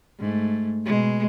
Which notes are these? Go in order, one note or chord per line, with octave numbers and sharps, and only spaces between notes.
G#2 A3
B2 G#3